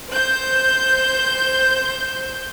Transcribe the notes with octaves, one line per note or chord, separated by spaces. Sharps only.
C5 G6